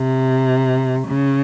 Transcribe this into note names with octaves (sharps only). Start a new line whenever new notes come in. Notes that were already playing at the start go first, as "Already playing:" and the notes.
Already playing: C3
C#3